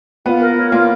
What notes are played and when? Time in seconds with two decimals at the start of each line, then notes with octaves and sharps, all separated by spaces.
0.25 B3 F4
0.41 A#4
0.57 C#5
0.72 A#3 F4